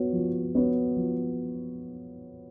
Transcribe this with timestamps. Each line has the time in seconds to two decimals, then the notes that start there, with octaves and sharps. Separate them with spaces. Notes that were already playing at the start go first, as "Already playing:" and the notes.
Already playing: B3 F#4 C#5
0.13 F3
0.55 B3 F#4 C#5
0.97 F3